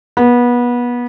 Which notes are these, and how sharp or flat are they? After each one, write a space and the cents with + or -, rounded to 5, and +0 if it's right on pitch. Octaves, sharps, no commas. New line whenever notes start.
B3 -25